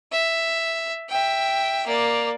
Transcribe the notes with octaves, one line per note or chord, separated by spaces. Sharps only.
E5
E5 G5
A#3 D5